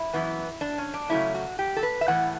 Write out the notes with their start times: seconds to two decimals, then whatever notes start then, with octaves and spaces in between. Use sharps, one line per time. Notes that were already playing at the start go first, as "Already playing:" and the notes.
Already playing: E4
0.13 F#2 E3 B3
0.61 D4
0.78 C#4
0.94 D4
1.10 C#3 F#3 A3 C#4 E4
1.35 F#4
1.59 G4
1.76 A4
1.83 B4
2.01 E5
2.08 A2 E3 B3 F#5